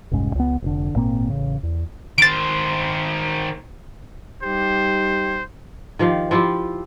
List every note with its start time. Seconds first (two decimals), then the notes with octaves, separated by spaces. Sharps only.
0.12 F1 C2 G#2 C#4
0.35 C#2 B3
0.62 F1 G#2 D3
0.94 G#1 A#2 A#3 C4
1.28 A1 C#3
1.63 E2
2.18 D#3 C5 A6 D7
4.43 G3 D#4 G4 C5
5.99 D#3 F3 G4 F5
6.31 F3 E4 F4 G4